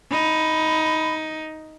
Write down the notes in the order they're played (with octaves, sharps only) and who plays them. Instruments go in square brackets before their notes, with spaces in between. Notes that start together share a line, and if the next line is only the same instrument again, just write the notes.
[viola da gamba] D#4 [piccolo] B5